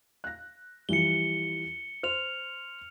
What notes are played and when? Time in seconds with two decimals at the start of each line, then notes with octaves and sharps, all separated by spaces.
0.24 F#6 A#6
0.89 E3 F3 G3 C#7 G7
2.03 C5 F6 F7